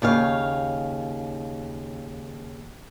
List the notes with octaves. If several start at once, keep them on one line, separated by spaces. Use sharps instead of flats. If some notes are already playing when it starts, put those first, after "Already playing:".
D#2 C#3 C#5 F5